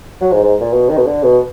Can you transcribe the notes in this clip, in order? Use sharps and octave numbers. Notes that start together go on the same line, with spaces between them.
F#3
G#2
G#2
A#2
B2
D#3
B2
D3
B2